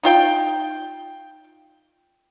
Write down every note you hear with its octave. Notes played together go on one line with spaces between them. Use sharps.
D#4 F4 G5